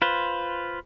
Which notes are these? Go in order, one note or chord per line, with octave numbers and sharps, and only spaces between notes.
F4 B4 C5